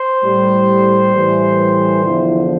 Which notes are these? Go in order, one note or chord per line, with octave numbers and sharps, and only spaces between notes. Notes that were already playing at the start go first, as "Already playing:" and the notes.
Already playing: C5
A2 G3
A2 E3 G3
E2 D3 F3 E4